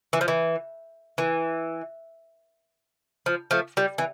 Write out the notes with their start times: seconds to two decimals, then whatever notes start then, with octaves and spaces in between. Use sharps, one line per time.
0.13 E3
0.21 F3
0.28 E3
1.18 E3
3.26 F3
3.51 F3 A3
3.77 G3
3.98 E3